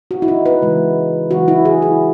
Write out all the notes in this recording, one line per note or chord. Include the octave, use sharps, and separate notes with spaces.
F#4
E4
D#4
B4
C#3 E3 G#3
C#3 E3 G#3 F#4
E4
G#4
E4